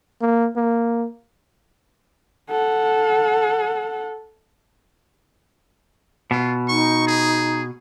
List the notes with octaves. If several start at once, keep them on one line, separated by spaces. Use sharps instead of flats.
A#3
A#3
A4 F#5
B2 F4
D#4 C#6
G#4